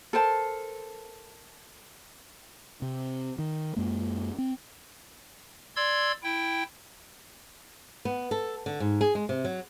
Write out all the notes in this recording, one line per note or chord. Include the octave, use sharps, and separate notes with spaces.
A4 A#4 C5 A5
C3
D#3
F#2 G#3 A#3
C4
D5 C6 E6 G#6
E4 G5
B3
A4
D3
G#2
G#4
G#3
C3
F#3